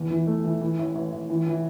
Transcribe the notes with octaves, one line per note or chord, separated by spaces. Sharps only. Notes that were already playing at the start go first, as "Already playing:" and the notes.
Already playing: E2
E3
A3
E3
E3
A1
A1
A1
E3
E3